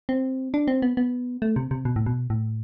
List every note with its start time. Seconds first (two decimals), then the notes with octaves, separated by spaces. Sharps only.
0.09 C4
0.54 D4
0.68 C4
0.82 B3
0.97 B3
1.42 A3
1.56 C3
1.71 C3
1.85 B2
1.96 A2
2.06 B2
2.30 A2